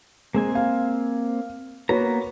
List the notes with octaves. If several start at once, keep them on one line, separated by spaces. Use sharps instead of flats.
G#3 A#3 C4 G#5
F5
A#3 B3 F#4 B4 C#5 A#5